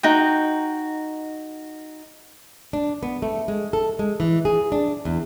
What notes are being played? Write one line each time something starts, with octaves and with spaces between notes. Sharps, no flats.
D#4 F#4 G5
D4
B3
A3
G#3
A4
G#3
E3
G#4
D4
E2